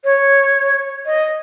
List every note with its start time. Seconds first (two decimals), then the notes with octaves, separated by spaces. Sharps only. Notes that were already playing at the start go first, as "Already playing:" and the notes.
0.04 C#5
1.06 D#5